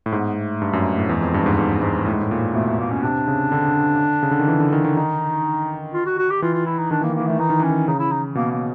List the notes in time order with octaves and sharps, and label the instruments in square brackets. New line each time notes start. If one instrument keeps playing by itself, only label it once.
[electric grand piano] A2
[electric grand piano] G#2 [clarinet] B3
[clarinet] A3
[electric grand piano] G2
F#2
A2
[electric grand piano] E2 [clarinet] G#3
[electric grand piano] F2
G2
G#2
G#2
G#2
A2
G#2
A2
A#2
[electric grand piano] B2 [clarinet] A3
[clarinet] A3
A#3
C#4
[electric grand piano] C3 [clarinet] D4
[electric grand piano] C#3
D3
C#3
D3
D#3
E3
D3
D#3
D#3
[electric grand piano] D#3 [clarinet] D#4
[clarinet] F4
F#4
F#4
G4
[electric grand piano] E3 [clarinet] F4
[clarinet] F4
E4
D#4
[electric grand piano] D#3 [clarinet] D4
[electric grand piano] E3 [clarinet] A#3
[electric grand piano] D#3
[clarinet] A#3
[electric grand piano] E3
[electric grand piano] D#3 [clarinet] A3
[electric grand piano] E3 [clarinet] D#4
[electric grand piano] D#3
[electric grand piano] E3 [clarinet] C#4
[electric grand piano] D#3
[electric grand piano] C#3 [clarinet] D#4
[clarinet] E4
D#4
[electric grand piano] B2 [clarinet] A#3
[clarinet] A#3